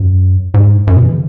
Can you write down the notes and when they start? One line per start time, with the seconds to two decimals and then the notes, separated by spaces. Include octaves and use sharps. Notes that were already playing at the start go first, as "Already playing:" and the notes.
Already playing: F#2
0.54 G#2
0.87 F#2
0.96 B2
1.04 E3
1.12 C#3